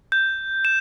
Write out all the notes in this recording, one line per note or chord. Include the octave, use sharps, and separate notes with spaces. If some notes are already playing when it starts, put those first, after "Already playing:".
G6
E7